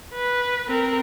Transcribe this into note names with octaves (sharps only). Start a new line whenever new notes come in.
B4
C4 A#4